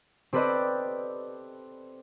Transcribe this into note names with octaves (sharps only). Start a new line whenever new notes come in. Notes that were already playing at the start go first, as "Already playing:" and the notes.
C4 G4 A4 B4 D5 D#5